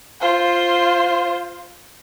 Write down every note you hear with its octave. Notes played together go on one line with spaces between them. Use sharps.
F4 C5